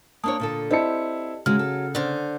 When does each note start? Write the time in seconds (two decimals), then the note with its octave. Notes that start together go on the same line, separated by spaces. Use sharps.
0.24 A#3 D4 C#5 A5 D#6
0.40 A#2 D3 A4
0.71 C4 E4 G4 D5 D#5 A5 C#7
1.46 C#3 F#3 G#3 F6
1.59 A4
1.95 D3 C5